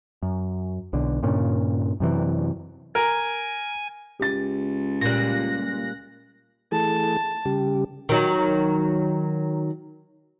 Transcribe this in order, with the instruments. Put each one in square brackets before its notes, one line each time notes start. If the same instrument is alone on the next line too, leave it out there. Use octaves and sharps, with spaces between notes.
[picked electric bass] F#2
B1 D3
G2 A#2 C#3
F#2 C3 E3
[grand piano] A#4 [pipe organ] G#5
[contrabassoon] C#2 [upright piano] G4 A6
[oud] A#2 G3 [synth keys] F#6 A#6
[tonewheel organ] E3 A3 G#4 [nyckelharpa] A5
[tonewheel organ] C#3 G3 G4
[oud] D#3 F#3